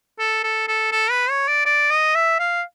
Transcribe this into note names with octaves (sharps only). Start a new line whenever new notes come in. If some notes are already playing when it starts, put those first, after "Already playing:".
A4
A4
A4
A4
B4
C#5
D5
D5
D#5
E5
F5